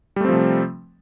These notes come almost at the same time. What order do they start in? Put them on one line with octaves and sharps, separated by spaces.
G3 A3 C4 F3 C3